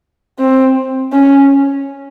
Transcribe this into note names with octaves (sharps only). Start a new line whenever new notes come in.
C4
C#4